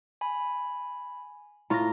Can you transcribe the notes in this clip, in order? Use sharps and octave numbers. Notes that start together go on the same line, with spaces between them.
G#5 B5
A2 F4 A#5 A#6